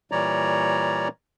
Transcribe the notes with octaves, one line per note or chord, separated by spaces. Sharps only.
A#2 E3 G3 C#5 D5 A#5